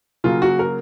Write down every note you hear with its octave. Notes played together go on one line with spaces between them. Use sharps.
C#3 F#3 A#3 F4
F#4
A#4